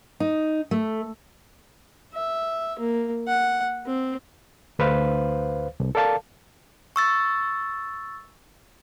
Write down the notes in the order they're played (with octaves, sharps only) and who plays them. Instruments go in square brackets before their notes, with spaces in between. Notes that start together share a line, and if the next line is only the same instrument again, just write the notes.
[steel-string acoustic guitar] D#4
A3
[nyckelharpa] E5
A#3
F#5
C4
[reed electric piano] D2 B4 C5 F5
C2
A4 A#4 D5 F5 A5
[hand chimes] C#6 E6 A6